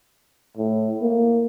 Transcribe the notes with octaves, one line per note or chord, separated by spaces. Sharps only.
A2
A#3